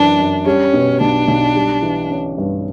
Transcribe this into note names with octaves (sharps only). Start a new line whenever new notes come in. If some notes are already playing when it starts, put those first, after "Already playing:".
Already playing: F#2 E3 D4
F#2
G3 C#4
B2
B1 D4
B1
G3
E3
C#4
G2